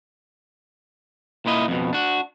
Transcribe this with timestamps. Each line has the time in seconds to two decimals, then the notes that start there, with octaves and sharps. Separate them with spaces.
1.46 A#2 A#3 E4 D#5
1.68 F2 B2
1.93 D4 F#4